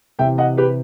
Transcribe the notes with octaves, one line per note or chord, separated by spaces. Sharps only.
C3 E3 E5 G5
D#5 F#5
G4 B4